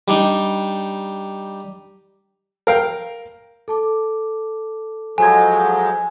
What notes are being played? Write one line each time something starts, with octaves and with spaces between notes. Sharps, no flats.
G3 D4 D#4
A#4 F5 G5
A4 A5 D6
F3 F#3 G#3 A4 G#5 G#6